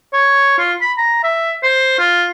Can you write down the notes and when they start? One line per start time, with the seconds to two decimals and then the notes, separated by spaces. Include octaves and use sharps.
0.13 C#5
0.58 F4
0.81 B5
0.98 A#5
1.24 E5
1.63 C5
1.99 F4